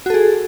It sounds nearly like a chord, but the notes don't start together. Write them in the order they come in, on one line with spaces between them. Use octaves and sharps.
F#4 A4 G#4